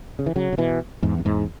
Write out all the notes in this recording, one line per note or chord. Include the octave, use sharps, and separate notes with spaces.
C#3
E3
C#3 F#3
C#3
B2 E3
E2 G#2
F#2
E2 G#2